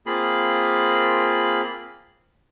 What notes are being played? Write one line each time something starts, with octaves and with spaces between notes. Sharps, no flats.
A#3 C4 F4 G#4 B5